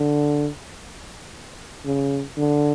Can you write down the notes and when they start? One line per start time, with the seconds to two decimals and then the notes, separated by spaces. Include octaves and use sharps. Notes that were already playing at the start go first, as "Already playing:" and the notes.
Already playing: D3
1.85 C#3
2.37 D3